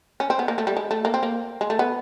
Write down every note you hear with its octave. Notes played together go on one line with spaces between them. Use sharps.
C#4
C4
B3
A#3
A3
G3
G#3
A3
A#3
C4
A#3
G#3
A3
B3